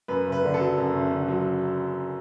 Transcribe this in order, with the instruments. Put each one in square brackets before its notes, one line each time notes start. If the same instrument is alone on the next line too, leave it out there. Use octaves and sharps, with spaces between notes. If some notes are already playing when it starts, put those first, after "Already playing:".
[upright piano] F#2 B4
F#1
B4
D3
A4
F#3
F#2
F#1
D3
F#3